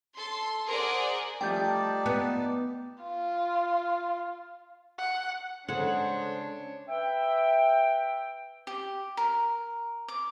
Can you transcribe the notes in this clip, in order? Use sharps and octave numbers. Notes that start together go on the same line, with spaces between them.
A4 C6
G#4 A#4 C5 D5 F#5
F3 G3 A3 D#4 D5 G5 A5 G6
B3
F4
F#5
C#3 G#3 D4 A4 C5 C#5 F#5
B4 E5 G5
G4
A#4
D6